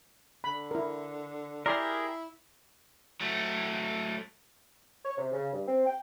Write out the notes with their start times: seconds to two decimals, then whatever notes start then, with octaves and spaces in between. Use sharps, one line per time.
0.44 D3 B5
0.71 E4 A#4
1.66 E4 G4 G#4 A#4 D5 A#5 C6
3.21 F#3 A3
5.04 C#5
5.17 C3
5.32 C#3
5.52 G2
5.67 C4
5.86 G5